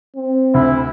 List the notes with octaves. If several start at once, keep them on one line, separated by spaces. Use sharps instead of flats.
C4
D2 E4